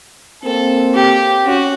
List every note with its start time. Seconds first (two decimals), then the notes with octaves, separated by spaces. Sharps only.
0.44 A#3 C4 A4
0.95 G4
1.45 C#4 F#4